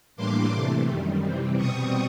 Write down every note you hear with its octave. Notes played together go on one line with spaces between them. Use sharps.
A2 E3 G3 A#3 D4 C6 D6
C3 E3 A3
F#2 D#3 G3
C3 E3 G3 C4
B2 G3 C4 C#6 D#6